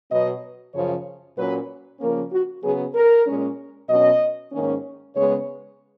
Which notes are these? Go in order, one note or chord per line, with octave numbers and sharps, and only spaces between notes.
B2 F#3 B3 D#5
F#2 C#3 F3 C#5
A#2 F#3 C#4 B4
C#3 F3 A#3 C#4 A#4
F#4
C#3 F#3 B3 G#4
A#4
A#2 G#3 C#4
B2 F#3 C#4 D#5
G#2 D#3 A#3 C#4
C#3 G#3 B3 C#5